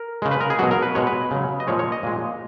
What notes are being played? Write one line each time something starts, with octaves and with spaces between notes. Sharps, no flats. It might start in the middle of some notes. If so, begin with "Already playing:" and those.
Already playing: A#4
C#3 G#3
B4
A#4
G#4
B2 F#3 F#4
A#4
B4
B2 G#3 C#5
B4
C#3 F#3
D#5
A#2 F3 G#3 C#5
C#5
D#5
A#2 G#3